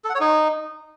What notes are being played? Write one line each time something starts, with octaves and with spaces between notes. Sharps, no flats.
A4
F#5
C#5
D#4